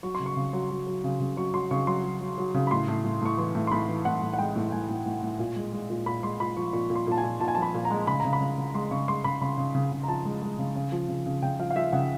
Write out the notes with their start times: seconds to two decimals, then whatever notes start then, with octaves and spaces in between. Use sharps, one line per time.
0.03 F#3 C#6
0.15 C6
0.20 C#3
0.26 C#6
0.37 C#3
0.53 F#3
0.70 F#3
0.87 F#3
1.04 C#3
1.20 C#3
1.37 F#3 C#6
1.54 F#3 C6
1.71 C#3 C#6
1.87 F#3 C6
2.04 F#3
2.21 F#3
2.38 F#3
2.54 C#3
2.67 B5
2.71 A2 C6
2.88 A2
3.04 A2
3.21 A2 C#6
3.38 E3 C6
3.55 A2
3.67 C6
3.71 A2 B5
3.89 E3
4.05 A2 F#5
4.22 A2
4.33 F#5
4.39 G#3 G5
4.56 A2
4.72 A2 G#5
4.89 A2
5.06 A2
5.23 A2
5.39 A#2
5.56 G#3
5.73 G#3
5.90 A#2
6.06 A#2 B5
6.23 G#3 C6
6.40 A#2 B5
6.57 F3 C#6
6.73 A#2 C#6
6.90 A#2
6.95 C6
7.07 A#2 A5
7.18 G#5
7.23 A#2
7.40 A#2 A5
7.48 G#5
7.55 F3 A5
7.62 B5
7.74 A#2
7.85 A#5
7.91 G#3
8.07 C#3 B5
8.20 C#3 A#5
8.33 B5
8.41 C#3
8.58 C#3
8.74 G#3 C6
8.91 C#3 C#6
9.08 G#3 C6
9.24 C#3 B5
9.41 C#3 B5
9.58 C#3
9.75 C#3
9.92 C#3
10.03 A#5
10.08 F3 A5
10.25 G#3
10.42 G#3
10.59 C#3
10.75 C#3
10.92 F3
11.08 C#3
11.26 C#3
11.43 C#3 G5
11.59 F3 F5
11.71 F5
11.76 F3 E5
11.93 C#3 F#5